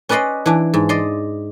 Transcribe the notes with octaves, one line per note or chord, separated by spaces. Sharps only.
C#4 B4 D5 D#5 B5 C6
E3 D4
G#2
D5 D#5 C6